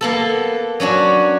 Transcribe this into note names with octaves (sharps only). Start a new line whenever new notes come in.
A#3 B3 A4
F#3 C#4 D4 F#4